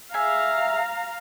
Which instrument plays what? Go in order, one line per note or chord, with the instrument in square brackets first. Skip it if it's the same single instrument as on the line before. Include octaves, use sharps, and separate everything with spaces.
[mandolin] G#4 E5 [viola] F5 A#5